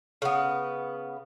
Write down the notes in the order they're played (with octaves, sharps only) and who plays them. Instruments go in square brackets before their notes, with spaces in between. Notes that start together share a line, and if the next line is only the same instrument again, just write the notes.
[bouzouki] C#3 B3